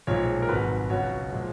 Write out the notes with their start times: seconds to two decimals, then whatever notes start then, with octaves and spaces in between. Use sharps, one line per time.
0.07 B1 A#2 F3 G#3 C#5
0.42 A#4
0.49 G#1 G#2 F#3 B4
0.90 C#2 B2 F#3 C#5
1.32 A#2 F3 G#3